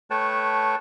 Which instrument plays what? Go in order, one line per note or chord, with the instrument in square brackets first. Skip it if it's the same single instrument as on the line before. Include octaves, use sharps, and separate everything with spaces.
[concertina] A3 B4 C#5 G5 A5